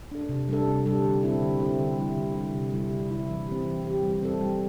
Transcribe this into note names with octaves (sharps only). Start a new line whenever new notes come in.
D4 A4
C3
G3 D4 A4
C3
G3 D4 A4
D3
C4 E4
D3
C4 E4
D3
G3 E4
D3
G3 E4
C3
G3 E4
C3
G3 E4
E3
C4 G4
E3
C4 G4
G3
C4 A4
G3